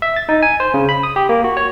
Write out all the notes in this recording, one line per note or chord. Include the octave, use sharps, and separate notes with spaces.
E5
A6
D#4
G#5
C5
C#3
B5
D#6
G4
A#3
F#4
C#5